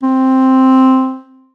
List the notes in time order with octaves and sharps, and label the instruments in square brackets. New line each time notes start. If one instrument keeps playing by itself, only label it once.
[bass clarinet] C4